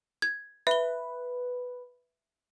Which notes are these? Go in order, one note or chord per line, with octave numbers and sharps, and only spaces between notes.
G#6
B4 E5 G7